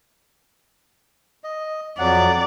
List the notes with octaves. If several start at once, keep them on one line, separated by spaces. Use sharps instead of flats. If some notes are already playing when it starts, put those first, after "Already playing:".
D#5
F2 F#3 D5 F#5